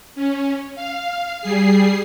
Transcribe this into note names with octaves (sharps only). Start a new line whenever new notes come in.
C#4
F5
G3 G#4 C7